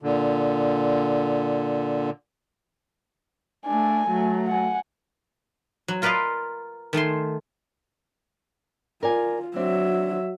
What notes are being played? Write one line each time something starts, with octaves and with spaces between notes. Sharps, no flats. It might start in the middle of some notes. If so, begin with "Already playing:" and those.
A#2 D3
A3 D4 G#5
F#3 A3
F#5 G#5
F#3
F4 A#4 B4 D5 D#5 F5
D#3 A3 G#5 C6
F4 A#4 D5 G#5
F#3 C4 D4 E5